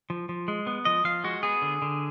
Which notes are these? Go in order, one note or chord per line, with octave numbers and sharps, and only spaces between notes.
F3
F3
G#3
B3
F3 D#5
F3 F5
G#3 F#4
B3 G#4
D3
D3